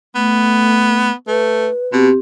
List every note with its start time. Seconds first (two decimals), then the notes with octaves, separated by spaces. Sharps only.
0.15 A3 B3
1.28 A3 B4
1.92 B2 C4 G4